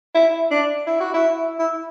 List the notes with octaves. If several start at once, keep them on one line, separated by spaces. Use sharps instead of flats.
E4
D4
E4
F#4
E4
E4